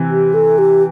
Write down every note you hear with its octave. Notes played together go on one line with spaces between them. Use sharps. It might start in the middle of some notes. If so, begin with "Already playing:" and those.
Already playing: C3 E3
G4
A4
G4